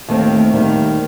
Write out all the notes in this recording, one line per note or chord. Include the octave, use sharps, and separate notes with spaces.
D#2 D#3 A3 C4
D#2 D#3 G3